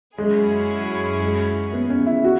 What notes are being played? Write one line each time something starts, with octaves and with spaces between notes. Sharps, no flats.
F#2 F#3 G#3 C#4 E4 G#4
G#3
B3
C#4
E4
F#4